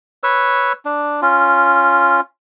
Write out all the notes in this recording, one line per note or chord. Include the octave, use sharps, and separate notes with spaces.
B4 C#5 E6
D4
C#4 F4